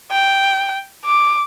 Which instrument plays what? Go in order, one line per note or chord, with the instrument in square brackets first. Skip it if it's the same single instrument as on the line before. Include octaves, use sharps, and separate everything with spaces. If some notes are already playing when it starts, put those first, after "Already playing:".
[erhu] G5
D6